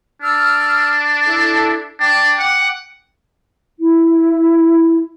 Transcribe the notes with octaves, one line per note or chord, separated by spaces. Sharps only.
D4 E6 F6
E4 A4
D4 G5 D6
F#5
E4